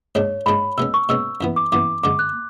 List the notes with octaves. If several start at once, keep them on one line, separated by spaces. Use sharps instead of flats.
G#2 G#3 D4 C#5
G#2 G#3 D4 B5
B2 G#3 C#4 E6
C#6
B2 G#3 C#4 E6
F#2 E3 B3
D6
F#2 E3 B3 D6
F#2 D3 G#3 D6
F#6